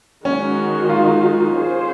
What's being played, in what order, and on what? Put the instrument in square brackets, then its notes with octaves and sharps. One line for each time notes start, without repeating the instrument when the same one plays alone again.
[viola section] D#3 G#3 D#4 F#4 [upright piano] C#4
[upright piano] F4
[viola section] C#4 G#4 C5